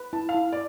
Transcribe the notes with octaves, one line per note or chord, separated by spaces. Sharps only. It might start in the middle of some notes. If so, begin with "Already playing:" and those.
Already playing: B4
E4 A5
F5
E4
D5